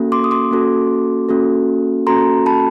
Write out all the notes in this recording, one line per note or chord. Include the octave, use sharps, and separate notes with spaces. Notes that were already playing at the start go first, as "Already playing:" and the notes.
Already playing: A#3 C#4 F#4 A4
C6 D6
D#6
C6 D6
A#3 C#4 F#4 A4
A#3 C#4 F#4 A4
A#3 C#4 F#4 A4 A#5 C6
A5 B5